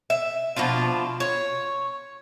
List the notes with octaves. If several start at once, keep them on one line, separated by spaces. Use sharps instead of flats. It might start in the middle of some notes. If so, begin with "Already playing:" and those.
E5
B2 F3 D4 F4
C#5